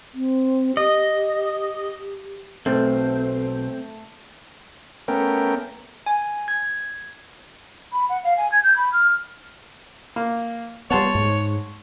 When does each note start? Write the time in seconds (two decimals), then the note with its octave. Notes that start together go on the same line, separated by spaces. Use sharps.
0.14 C4
0.77 G4 D#5
2.66 B1 A3 C4
5.08 A3 B3 C#4 A#4 G5
6.06 G#5
6.48 G#6
7.92 B5
8.09 F#5
8.24 F5
8.37 G#5
8.52 G#6
8.63 G6
8.76 B5
8.92 F6
10.16 A#3
10.91 G3 B3 C#5 F#5 A5 C6
11.15 G#2